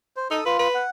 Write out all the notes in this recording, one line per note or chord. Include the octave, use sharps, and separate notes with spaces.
C5
D#4 A4 D#6 E6
F4 B4
B4
F#5